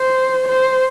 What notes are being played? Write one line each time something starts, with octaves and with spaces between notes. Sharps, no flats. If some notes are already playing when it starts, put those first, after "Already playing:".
Already playing: C5
C5